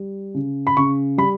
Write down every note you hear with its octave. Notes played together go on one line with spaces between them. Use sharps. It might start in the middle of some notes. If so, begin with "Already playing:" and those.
Already playing: G3
C#3
B5
C#3 C#6
G3 B5